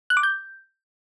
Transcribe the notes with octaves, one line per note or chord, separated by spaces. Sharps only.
F#6
D6
G6